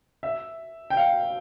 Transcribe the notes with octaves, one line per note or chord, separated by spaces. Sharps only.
E5
G5
F5